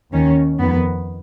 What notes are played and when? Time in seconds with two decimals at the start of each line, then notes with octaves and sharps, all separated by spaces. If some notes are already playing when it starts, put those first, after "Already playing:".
0.13 D#2 D#3 C#4
0.59 F2 D#3 B3